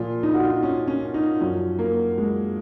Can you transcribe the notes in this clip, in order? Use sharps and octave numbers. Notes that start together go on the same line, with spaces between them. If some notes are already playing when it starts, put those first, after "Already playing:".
Already playing: A#2 F3 F4
D#4
F#4
F4
D#4
C#4
C#4
D#4
F#2 F3 C#4
A#3
G#3